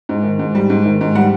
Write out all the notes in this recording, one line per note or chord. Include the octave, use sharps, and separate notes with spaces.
G#2
D#3
G#2
G3
G#2
D#3
G#2
G3 F#5